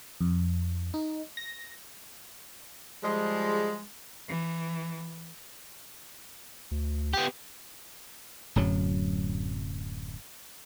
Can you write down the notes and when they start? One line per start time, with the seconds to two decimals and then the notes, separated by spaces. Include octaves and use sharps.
0.21 F2
0.94 D#4
1.37 A#6
3.03 F3 G3 G#3
4.28 E3
6.71 D2
7.14 B3 G4
8.56 D1 F#2 F#3